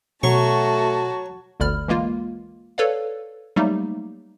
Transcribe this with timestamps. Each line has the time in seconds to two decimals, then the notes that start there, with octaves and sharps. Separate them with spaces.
0.23 B2 F#3 A3 F#4 A5 C#6
1.60 G1 D2 D3 D5 B5 F6
1.88 E3 G#3 A#3 F4
2.78 A4 B4 C#5 D5 F5
3.56 F#3 G3 A3 A#3 D#4 G4